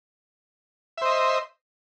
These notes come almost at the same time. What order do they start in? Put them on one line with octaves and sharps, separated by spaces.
E5 C5 D#5